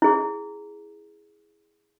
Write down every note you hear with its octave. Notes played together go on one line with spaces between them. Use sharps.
E4 G#4